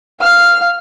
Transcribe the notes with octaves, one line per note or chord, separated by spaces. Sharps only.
F5 F6